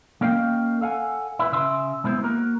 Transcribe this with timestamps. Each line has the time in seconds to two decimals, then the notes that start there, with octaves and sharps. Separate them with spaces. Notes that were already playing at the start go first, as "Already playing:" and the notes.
0.21 A#3 C#4 A#4 D#5 F5 G5
0.81 A4 F5 F#5 G#5
1.39 E4 B4
1.52 C#3 E5 C6
2.04 G#3 B3 E4 C5
2.23 A#3 F#4 A#4